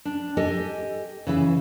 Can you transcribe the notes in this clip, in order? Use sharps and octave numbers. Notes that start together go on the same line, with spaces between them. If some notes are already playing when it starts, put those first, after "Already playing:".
D4
G4 A4 D#5 G#5
C#3 E3 E5